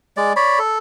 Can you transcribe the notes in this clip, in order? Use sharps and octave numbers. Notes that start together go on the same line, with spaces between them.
G#3 D5
C#5 D5 B5
A4